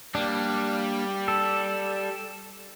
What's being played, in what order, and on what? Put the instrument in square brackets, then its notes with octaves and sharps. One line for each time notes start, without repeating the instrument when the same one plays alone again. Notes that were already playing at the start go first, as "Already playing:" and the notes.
[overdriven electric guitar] G3 [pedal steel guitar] A#3 D4
[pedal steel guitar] A4